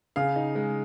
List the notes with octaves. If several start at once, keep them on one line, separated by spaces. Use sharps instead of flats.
C#3 F5
D#4
G#3